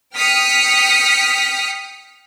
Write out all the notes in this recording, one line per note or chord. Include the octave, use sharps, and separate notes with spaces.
G5 D#6 F6 B6 C#7